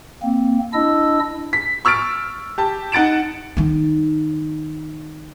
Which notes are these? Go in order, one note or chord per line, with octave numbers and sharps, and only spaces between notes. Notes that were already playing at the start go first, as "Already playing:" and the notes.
A#3 C4
D4 E4 D#5 E6
B6
C#6 E6 F6 A6 D7
G4 A5
D#4 F#5 A6 D7 E7
D#3 D#4